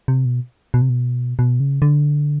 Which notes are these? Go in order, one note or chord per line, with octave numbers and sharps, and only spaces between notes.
C3
B2
B2
C3
B2
B2
C#3
D3